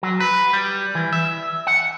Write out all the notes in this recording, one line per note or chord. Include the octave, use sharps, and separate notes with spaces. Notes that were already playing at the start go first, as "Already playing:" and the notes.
F#3
B4
G3
E3
E5
F#5